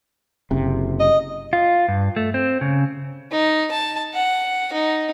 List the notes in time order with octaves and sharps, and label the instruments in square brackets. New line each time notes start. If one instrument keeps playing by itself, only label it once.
[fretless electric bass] F#1 C3
[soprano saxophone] D#5
[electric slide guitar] F4
G2
A3
C4
C#3
[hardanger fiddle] D#4
A5
F#5
D#4